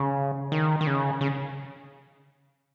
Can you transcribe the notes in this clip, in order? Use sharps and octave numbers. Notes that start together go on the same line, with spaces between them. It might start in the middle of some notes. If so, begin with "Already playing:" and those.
Already playing: C#3
D#3
D#3
C#3
C#3